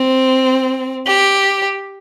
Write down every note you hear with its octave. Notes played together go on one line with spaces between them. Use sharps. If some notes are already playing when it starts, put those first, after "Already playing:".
Already playing: C4
G4